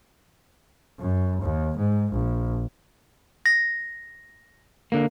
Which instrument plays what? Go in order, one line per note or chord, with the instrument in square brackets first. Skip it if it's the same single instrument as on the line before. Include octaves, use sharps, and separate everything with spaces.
[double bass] F#2
D#2
G#2
A#1
[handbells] A#6
[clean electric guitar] D3 A#3